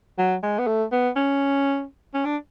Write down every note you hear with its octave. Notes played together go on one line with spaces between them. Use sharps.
F#3
G#3
B3
A3
B3
C#4
C#4
D4